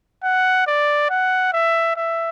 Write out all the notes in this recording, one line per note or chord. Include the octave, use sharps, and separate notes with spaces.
F#5
D5
F#5
E5
E5